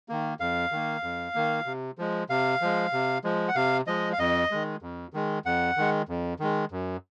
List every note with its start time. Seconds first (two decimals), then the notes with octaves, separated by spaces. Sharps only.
0.09 D#3 A#3
0.40 F2 F5
0.72 D#3 A#3
1.03 F2
1.35 D#3 A#3
1.66 C3
1.98 F3 G#3
2.30 C3 F5
2.61 F3 G#3
2.93 C3
3.24 F3 G#3
3.48 F#5
3.55 C3 F5
3.87 F3 G#3 D#5
4.13 F5
4.19 F2 D#5
4.51 D#3 G#3
4.82 F2
5.13 D#3 G#3
5.46 F2 F#5
5.77 D#3 G#3
6.09 F2
6.40 D#3 G#3
6.72 F#2